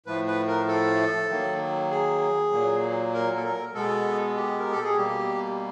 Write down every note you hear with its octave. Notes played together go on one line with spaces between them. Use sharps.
A2 F3 A3 B4
B4
A#4
A4
D#3 F#3 A#3
G#4
A#2 F#3 A#3
A#4
A4
A#4
B2 G#3 B3 A4
G4
A#4
A4
G#4
B2 G3 A#3 G4